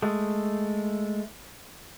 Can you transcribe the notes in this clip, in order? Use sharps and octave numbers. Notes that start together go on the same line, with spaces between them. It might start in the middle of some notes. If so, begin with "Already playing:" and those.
G#3 A3